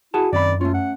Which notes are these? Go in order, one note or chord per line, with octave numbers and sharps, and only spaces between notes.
E4 F#4 G#4 A5
F#2 D#3 C4 D5 B5
A3 C#4 F4
F#5